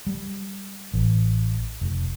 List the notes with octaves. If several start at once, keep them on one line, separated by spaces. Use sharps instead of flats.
G3
A1
F1